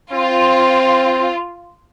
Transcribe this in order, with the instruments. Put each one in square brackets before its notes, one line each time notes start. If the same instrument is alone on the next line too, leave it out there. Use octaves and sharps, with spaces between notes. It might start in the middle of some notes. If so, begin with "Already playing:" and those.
[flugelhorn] C4 [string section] F4